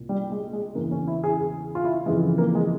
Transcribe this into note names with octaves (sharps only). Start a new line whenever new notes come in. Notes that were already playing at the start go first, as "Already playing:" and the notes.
Already playing: C2 A#2
G3
G#3
G#3
E2 C#3 E3 A#3
C#4
E4
G#4
G#4
F4
E4
F2 C#3 E3 G#3
A#3
G#3